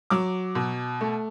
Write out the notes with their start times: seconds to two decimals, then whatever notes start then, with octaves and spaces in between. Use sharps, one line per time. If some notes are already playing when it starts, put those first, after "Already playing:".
0.10 F#3 D6
0.55 B2
1.01 A3